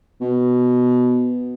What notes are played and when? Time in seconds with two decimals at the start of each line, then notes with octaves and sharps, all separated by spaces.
0.21 B2